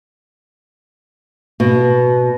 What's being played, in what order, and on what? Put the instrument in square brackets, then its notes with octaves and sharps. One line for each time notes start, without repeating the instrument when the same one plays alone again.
[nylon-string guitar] B2